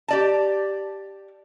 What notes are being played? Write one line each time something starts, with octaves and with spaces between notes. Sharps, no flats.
G4 D5 A5